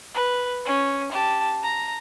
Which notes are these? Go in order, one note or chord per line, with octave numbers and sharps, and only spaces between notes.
B4
C#4
G4 A5
A#5